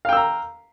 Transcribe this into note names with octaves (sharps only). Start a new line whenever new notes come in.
F5 G5 A#5 E6